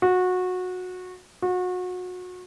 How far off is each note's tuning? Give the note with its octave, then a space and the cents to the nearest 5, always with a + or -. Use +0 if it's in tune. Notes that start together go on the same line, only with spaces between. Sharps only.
F#4 -20
F#4 -30